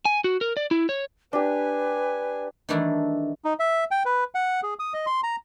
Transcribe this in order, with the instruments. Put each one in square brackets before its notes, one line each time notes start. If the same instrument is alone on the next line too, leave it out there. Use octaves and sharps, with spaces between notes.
[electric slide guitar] G#5
F#4
A#4
D5
E4
C#5
[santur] D4 G4 [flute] B4 [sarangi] G#5
[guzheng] D#3 E3 G3 A3 D4 E4
[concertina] D#4
E5
G5
B4
F#5
G#4
D#6
D#5
C6
A#5